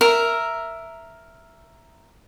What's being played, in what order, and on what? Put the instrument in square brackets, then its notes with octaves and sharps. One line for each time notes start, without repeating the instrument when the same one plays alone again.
[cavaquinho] A#4 E5